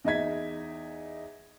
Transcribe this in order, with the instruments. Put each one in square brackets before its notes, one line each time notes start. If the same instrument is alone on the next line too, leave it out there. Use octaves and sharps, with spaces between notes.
[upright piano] E2 D#4 D#5 E5 G#6 B6